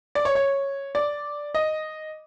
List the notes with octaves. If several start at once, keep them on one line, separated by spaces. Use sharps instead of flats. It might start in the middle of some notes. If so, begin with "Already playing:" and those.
D5
C#5
C#5
D5
D#5